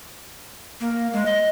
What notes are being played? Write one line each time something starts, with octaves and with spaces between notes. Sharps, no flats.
A#3
G#3
D#5